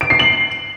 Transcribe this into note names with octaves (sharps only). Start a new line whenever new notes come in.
D7
C7
F#7